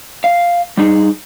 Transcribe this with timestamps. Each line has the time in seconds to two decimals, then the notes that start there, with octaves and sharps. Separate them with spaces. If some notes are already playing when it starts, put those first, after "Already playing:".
0.24 F5
0.77 G3 D#4 G#4